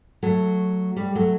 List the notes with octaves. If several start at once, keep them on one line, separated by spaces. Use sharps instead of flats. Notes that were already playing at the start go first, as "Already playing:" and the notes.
F#3 A3
G3
F#3 A3